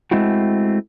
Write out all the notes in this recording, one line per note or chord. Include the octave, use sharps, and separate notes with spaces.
G#3 A3 C4 E4 F#4